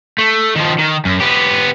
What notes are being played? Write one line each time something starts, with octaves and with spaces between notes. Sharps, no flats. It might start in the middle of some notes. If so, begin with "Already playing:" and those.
A3
D#3 F3
D#3
F#2
B3 G4